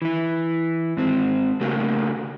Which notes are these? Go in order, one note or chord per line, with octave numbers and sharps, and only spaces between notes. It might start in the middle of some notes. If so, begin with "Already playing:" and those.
E3 E4
G#2 C4
C#3 A3 A#3 F#4 G4